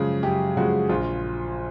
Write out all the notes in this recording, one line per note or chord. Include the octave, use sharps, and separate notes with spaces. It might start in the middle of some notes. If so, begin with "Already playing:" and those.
Already playing: F#2 C#3 F3 G#3 G#4
F#2 G4
C#3 F3 G#3 F#4
A#1 F4